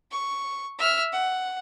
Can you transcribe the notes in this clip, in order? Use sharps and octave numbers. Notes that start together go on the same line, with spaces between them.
C#6
E5 F6
F#5